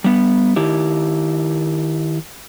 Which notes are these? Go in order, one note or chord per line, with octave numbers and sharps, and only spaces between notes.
G3 B3
D#3 E4 G4